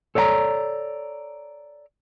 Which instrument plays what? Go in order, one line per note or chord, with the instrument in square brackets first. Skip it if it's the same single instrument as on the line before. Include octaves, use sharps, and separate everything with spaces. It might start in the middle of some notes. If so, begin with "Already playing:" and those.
[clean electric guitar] A4 C#5 D5 F5 A#5